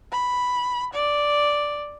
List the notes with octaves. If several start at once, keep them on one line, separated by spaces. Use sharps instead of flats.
B5
D5